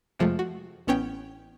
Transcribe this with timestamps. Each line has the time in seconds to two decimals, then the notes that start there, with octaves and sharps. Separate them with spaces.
0.19 F2 C3 F3 G#3 A3
0.39 F#4
0.87 A1 B3 C#4 C#5 G5